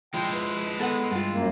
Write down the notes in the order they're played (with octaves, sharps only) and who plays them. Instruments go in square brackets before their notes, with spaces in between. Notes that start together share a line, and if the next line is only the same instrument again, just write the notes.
[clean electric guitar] F3 [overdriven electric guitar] G#3 E4 [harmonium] G5
[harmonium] B4
[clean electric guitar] B3 A4 F#5
G2 F4
[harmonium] F#2 A#3